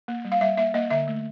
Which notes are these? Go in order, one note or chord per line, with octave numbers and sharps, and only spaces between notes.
A#3
G3
F5
G3 E5
A#3 E5
A#3 D#5
D3 E5
A3